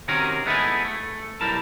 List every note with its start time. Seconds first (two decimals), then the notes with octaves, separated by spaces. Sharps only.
0.08 C3 D#3 C#4 F#4 G#4 A#4
0.46 G#3 A3 B3 C#4 E4 G#4
0.85 A3
1.41 B1 G3 E4 A#4 A5